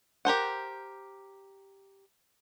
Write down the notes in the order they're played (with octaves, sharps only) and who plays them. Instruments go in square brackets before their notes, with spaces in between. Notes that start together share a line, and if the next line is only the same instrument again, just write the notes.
[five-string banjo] G4 A#4 C5 F#5